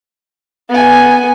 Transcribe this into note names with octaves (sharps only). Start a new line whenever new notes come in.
B3 G#5